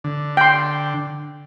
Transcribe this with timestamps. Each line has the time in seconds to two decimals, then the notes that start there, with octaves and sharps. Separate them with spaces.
0.04 D3
0.37 G5 C6